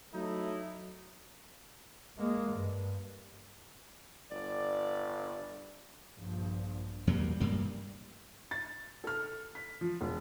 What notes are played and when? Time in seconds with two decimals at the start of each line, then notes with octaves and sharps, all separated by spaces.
0.15 F#3 A3 D#4 E4
2.18 G#3 A#3
2.51 G2
4.31 G1 D5
6.18 A#1 G2 F3
7.07 E2 F#3 G3 A#3
7.40 A1 G2 A#3
8.51 A6
9.04 A4 F6
9.55 B6
9.81 F3
10.01 E1